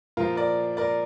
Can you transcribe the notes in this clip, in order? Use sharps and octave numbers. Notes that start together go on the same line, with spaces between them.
A#2 F3 F4 A#4
A#4 D5
A#4 D5